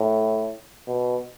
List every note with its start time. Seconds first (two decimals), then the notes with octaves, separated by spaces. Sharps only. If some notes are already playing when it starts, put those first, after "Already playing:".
Already playing: A2
0.87 B2